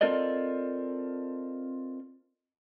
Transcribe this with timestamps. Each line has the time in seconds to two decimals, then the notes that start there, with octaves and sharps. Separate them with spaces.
0.01 C4 F4 A4 A#4 D5 D#5